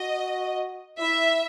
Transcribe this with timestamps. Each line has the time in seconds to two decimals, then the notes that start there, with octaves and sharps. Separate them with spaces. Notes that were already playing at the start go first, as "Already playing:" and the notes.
Already playing: F#4 D#5
1.00 E4 E5